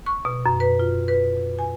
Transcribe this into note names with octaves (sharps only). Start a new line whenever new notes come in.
C#6
B2
F#2
B4
F4
B4
G#5